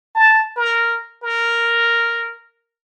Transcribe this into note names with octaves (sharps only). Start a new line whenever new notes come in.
A5
A#4
A#4